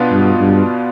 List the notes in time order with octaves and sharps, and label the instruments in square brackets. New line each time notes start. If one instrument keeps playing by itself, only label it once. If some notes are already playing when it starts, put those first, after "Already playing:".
Already playing: [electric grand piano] B2 B3 D4 F4
[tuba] G2
G2